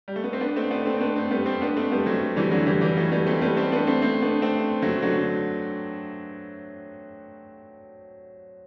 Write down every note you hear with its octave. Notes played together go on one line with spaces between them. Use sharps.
G3
A3
B3
C4
B3 D4
A3 C4
B3 D4
A3 C4
C4
B3 D4
A3 C4
G3 B3
A3 C4
B3 D4
A3 C4
G3 B3
F#3 A3
E3 G3
D3 F#3
E3 G3
E3 G3
F#3 A3
G3 B3
A3 C4
G3 B3
A3 C4
B3 D4
A3 C4
A3 C4
B3 D4
A3 C4
F#3 A3
D3 F#3